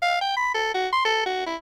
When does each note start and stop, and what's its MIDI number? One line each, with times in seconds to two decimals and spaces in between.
0.02 0.19 77
0.21 0.34 79
0.37 0.50 83
0.54 0.74 69
0.74 0.88 66
0.93 1.01 84
1.05 1.21 69
1.26 1.46 66
1.46 1.55 64